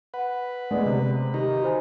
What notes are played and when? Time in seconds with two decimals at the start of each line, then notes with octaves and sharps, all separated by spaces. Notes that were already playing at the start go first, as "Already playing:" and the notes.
0.14 B4 F#5
0.71 G#3 B3 D5
0.86 C3
1.34 D#3 D#4 G4
1.62 F#4 C5 G#5